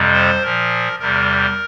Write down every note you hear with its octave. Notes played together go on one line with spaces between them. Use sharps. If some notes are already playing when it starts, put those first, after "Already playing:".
Already playing: F2 C3 G3
C5
A#2 F3 A#4
E2 C3 G3 A#4